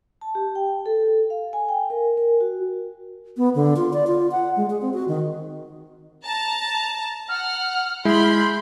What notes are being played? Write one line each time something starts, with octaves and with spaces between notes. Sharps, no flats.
A5
G4
G5
A4
F5
G#5
G5
A#4
A#4
F#4
B3
D3
F4
D5
F4
F#5
G#3
G#4
C4
F#4
D#3
A5 A#5
F#5 F6
G#3 E4 B5 C6 G6